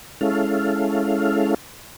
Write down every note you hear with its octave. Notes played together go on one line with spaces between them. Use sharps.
G#3 C#4 E4 A4 F5